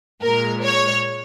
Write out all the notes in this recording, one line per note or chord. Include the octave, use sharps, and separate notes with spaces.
A#2 G#3 A#4
C#5